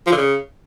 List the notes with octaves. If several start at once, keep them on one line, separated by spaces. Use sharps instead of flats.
F3
D3
C#3